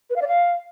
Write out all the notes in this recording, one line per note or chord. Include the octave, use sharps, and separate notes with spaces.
B4
F5
D5
F5